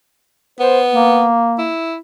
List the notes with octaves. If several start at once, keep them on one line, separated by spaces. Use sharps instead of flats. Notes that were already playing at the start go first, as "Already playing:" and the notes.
B3 C5
A#3
E4